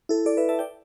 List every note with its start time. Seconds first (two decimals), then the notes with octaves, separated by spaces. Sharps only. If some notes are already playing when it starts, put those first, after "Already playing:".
0.09 E4 A4
0.26 A4 D5
0.37 B4 E5
0.49 E5 A5
0.59 D5 G5